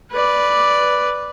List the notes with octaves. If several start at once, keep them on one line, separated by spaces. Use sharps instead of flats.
B4 D5